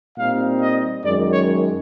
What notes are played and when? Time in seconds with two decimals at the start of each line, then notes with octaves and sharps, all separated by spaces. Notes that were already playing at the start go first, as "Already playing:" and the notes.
0.18 A#2 G3 C4 D#4 F5
0.62 D#5
1.04 F#2 D#3 G#3 D5
1.33 C#5